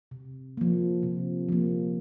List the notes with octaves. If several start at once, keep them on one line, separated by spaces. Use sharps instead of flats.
C3
F3 A#3
C3
F3 A#3